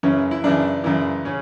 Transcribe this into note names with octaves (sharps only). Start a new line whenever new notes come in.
F#2 C#3 E3 C#4
E4
F#2 C#3 E3 D4
F#2 C#3 E3
C#3 C#4